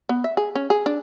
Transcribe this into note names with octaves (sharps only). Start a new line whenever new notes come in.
B3
E5
G#4
C#4
G#4
D4